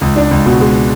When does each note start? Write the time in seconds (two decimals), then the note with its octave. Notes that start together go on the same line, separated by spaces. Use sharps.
0.01 C#2
0.16 D4
0.31 C#2
0.46 B2
0.61 G#3